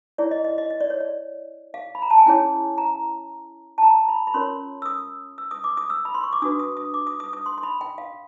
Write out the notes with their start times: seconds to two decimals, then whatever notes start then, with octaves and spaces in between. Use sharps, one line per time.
0.18 E4 G#4 C#5 D5
0.31 D#5
0.44 D#5
0.58 D#5
0.71 D#5
0.81 D5
0.90 C#5
1.00 D5
1.74 F5
1.95 B5
2.02 A#5
2.10 A5
2.18 G#5
2.26 C#4 E4 G#4 C#5 G5
2.78 A#5
3.78 A5
3.82 A#5
4.08 B5
4.27 B5
4.34 C#4 F4 A#4 C#5 C6
4.82 E6
4.86 D#6
5.38 E6
5.51 D#6
5.64 D6
5.77 D#6
5.90 E6
6.05 B5
6.14 C6
6.24 C#6
6.33 D6
6.42 D4 F#4 B4 D#6
6.59 D#6
6.77 D#6
6.94 D6
7.07 D#6
7.20 D#6
7.33 D#6
7.46 C6
7.58 C6
7.63 B5
7.81 G5
7.98 F5